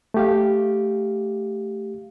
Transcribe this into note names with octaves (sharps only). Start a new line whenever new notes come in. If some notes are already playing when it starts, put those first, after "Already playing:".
A3 G4 F5